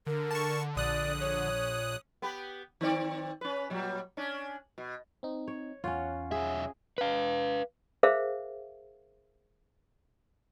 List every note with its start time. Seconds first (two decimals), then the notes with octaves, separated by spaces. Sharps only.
0.06 D3 A#4
0.31 A5 C#6
0.76 A#1 D5 D#6 F#6
1.20 C#5
2.22 B3 G4 B4
2.81 D#3 C4 D5
3.41 C#4 B4
3.70 A#2 F#3 G3
4.17 C#4 D4
4.78 B2
5.23 C4 D#4
5.47 C#5
5.84 E2 C#4 F4 C#5 F#5
6.32 B1 G#4 E5
6.98 B4 F5
8.03 G#4 A#4 C5 E5 F5